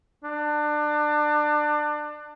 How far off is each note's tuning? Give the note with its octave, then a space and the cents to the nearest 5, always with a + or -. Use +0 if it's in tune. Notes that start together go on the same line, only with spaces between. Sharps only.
D4 +25